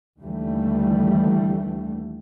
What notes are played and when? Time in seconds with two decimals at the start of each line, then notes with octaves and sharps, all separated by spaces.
0.21 D#2 D3 E3 G3 A3